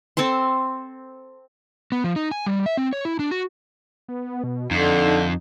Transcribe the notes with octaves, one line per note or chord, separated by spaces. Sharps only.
C4 A4 C5 C6
B3
F3
D#4
G#5
G3
E5
C4
C#5
E4
D4
F#4
B3
B2
F2 D3 D#4